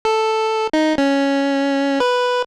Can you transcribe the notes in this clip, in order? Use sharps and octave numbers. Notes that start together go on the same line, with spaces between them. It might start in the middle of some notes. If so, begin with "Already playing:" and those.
A4
D#4
C#4
B4